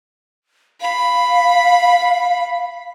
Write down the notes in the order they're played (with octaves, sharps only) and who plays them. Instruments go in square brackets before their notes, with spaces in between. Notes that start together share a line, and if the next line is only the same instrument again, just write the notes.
[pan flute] F5 [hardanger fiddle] B5